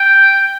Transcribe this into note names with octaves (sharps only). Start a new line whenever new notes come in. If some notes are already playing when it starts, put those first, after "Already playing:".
Already playing: G5